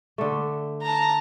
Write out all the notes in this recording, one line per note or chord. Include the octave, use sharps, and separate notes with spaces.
D3 A3
A5 A#5